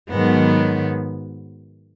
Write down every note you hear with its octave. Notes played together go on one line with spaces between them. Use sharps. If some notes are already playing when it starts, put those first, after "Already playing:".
G#2 D#3 F#3 B3